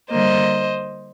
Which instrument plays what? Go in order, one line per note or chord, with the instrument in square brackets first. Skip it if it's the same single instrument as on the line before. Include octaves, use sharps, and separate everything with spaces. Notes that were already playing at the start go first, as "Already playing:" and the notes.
[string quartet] D3 G3 A#3 C5 D#5